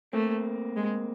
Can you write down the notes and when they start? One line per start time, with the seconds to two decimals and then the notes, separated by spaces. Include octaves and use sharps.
0.13 A3 A#3 C4
0.76 G#3